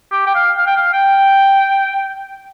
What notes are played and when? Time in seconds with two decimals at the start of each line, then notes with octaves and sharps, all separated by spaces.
0.12 G4
0.26 G5
0.35 F5
0.57 F5
0.66 G5
0.76 F5
0.93 G5